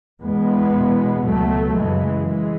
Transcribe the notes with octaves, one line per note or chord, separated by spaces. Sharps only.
E2 B2 G#3 B3
E2 B2
C#2 B2 F#3 A3
F#2 C#3 E3 G#3
E3 G#3